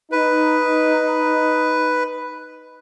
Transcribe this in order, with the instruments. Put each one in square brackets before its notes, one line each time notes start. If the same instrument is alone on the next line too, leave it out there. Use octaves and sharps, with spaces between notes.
[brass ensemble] D#4 [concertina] B4